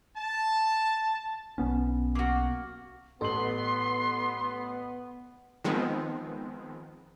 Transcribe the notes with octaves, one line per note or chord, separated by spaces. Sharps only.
A5
B1 B3 C#4
A#3 F#4
A1 B3 A4 C6 F#7
D#3 F3 G#3 B3 C4